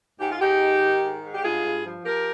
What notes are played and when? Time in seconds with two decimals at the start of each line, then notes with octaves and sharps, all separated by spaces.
0.19 G#2 G4
0.30 F4
0.40 G#2 D#4 G4
0.61 D#3
0.81 D#3
1.02 G#2
1.23 G#2
1.34 G4
1.43 G2 F4 G#4
1.64 G2
1.85 F3
2.05 F3 G4 A#4